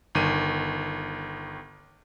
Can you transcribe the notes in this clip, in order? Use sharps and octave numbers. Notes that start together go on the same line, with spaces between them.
G1 D#3 D#7